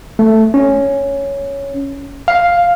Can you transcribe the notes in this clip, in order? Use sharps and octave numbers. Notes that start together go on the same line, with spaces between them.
A3
C#4
F5